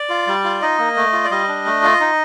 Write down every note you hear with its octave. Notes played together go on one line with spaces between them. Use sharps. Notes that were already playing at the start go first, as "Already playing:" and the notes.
Already playing: D5
F4
G3
F4
D#4 D#5
A#3
A3
F4
D5
G3 D#5
D4
A3
F4
D#4